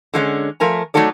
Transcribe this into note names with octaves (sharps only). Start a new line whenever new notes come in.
D3 G#3 A#3 C#4
F3 A3 A#4 G#5 A#5
F#3 A3 D#4 F#4 A4 D5